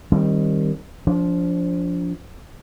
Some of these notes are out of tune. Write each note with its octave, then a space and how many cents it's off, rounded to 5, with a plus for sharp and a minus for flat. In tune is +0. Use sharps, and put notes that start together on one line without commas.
D#3 +0 G3 +0 C4 +35
F3 +5 D4 -30